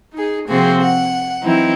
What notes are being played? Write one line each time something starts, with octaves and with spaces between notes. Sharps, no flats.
D#4 G#4
C3 F3 A#3 C4 F#4 G#4
F#5
E3 F#3 C4 D#4 E4